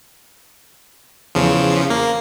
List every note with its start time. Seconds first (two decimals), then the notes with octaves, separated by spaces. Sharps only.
1.35 E2 C#3 F3
1.90 A#3